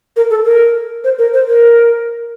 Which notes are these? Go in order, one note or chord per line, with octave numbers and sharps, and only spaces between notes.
A#4
A4
A#4
C5
A#4
C5
A#4